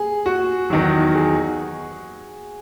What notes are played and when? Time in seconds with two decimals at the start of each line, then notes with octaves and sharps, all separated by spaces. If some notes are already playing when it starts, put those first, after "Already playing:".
Already playing: G#4
0.26 F#4
0.70 E2 D#3 F#3 F#4
1.15 G#4